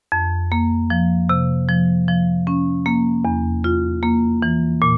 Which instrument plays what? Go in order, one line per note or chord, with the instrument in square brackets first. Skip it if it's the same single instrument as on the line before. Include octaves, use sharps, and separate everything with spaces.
[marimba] F2
A#3
F3
C3
F3
F3
C#4
A#3
E2
F4
A#3
E3
A#2